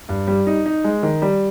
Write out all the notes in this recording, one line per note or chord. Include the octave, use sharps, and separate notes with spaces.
G2
G3
D#4
D#4
G#3
D#3
G3